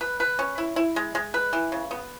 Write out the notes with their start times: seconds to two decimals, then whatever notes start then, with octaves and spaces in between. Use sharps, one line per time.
0.01 B4
0.20 B4
0.39 C#4
0.58 E4
0.76 E4
0.96 G#3
1.15 G#3
1.34 B4
1.53 E3
1.72 C#3
1.91 B3